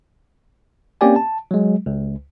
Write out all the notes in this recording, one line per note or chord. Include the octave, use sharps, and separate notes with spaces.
A#3 C4 C#4 G4 D5 G#5
A5
F#3 G#3
C#2